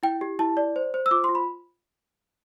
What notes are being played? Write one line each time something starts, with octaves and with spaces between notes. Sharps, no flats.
E4 G5
G4
E4 A5
D5
C5
C5
E6
F4 D6
C6
F4
B5